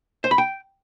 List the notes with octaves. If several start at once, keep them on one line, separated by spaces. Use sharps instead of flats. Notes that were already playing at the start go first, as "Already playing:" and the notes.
C5
B5
G5